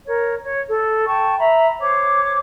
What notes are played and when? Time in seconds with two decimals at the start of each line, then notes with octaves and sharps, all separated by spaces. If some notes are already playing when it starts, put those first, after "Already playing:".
0.06 A#4 C#5
0.42 C#5
0.67 A4
1.06 G5 A5 C#6
1.39 E5 A#5 B5
1.79 C5 C#5 D6